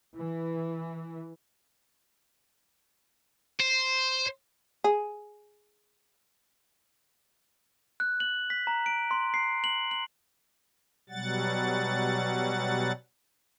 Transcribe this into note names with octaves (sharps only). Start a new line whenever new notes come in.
E3
C5
G#4
F#6
F#7
B6
A#5
D7
C6
C7
F#7
F#7
B2 F#3 G3 F#5 A6